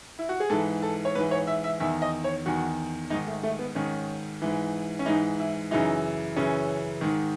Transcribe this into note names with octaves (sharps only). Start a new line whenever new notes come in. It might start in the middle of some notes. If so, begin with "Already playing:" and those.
E4
F#4
G#4
G#2 E3 A4
A4
C#5
G#2 E3 B4
C#5
E5
E5
E2 D#3 E5
D#5
C#5
E2 D#3 F#4
G#2 D#3 D#4
A3
A3
B3
G#2 D#3 C#4
G#2 E3
C#4
G#2 E3 D#4
E4
F#2 C#3 E3 D#4
F#2 C#3 E3 C#4
G#2 D#3